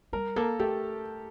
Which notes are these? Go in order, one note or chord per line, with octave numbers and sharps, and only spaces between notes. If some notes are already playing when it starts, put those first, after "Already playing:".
G3 A#4
A#3 A4
A3 G4